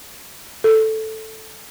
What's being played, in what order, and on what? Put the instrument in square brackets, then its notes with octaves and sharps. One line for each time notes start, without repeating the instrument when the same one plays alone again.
[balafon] A4